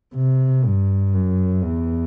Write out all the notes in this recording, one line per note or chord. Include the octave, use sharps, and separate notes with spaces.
C3
G2
F#2
E2